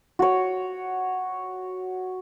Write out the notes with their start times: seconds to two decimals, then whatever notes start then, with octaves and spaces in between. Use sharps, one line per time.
0.19 F#4 C#5